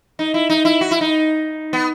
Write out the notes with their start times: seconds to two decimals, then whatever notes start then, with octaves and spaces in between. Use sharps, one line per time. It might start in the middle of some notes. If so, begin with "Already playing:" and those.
0.19 D#4
0.34 E4
0.50 D#4
0.65 E4
0.81 F#4
0.91 E4
1.01 D#4
1.73 B3